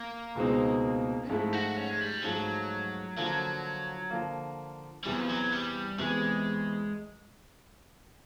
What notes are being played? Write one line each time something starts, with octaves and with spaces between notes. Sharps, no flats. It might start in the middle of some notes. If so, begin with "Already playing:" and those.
Already playing: A#3
C#2 B2 G#3 C4 D#4
G#2 F3 A3 E4
F#4
C#4
G#3
G3
G#2 F3 F#3 A3
D3 F3 F#3 A#3
D3 F3 A#3
E2 C3 E3 G3
F#3
F3
F#3
G3
E2 C3 E3 G#3